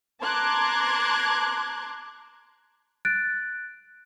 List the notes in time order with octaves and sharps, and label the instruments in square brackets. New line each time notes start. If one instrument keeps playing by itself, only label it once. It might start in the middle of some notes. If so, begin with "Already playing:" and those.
[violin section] A5 A#5 C6 D6 F#6 G#6
[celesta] F#6 A6 D7